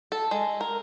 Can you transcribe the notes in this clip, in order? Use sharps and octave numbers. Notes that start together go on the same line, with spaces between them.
A4
G#3
A#4